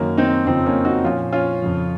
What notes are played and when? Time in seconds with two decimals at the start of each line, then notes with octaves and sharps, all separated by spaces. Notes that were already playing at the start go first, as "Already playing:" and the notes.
Already playing: F#2 D#3 A#3 C#4
0.17 C4 D#4
0.46 F2 C#3 F3 C4 D#4
0.66 A#3 C#4
0.85 D#4 F#4
1.04 A#2 F3 C#4 F4
1.32 C#4 F4
1.62 F2 C#3 F3